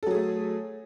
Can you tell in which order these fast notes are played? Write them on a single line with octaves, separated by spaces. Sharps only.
A4 F#3 G#4 A3